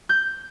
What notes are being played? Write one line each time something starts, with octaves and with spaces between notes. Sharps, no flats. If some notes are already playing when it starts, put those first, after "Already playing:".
G6